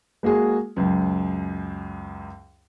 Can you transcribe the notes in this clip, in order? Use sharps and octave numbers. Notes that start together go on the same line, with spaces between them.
G#3 A#3 F#4 G#4
C#2 F#2